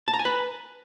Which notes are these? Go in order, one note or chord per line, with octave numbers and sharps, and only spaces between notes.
A5
A#5
G#5
B4